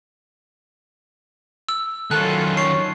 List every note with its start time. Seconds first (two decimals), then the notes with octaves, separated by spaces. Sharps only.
1.69 E6
2.11 D#3 F#3 C#4 F4 A4 F#6
2.57 C#5 C7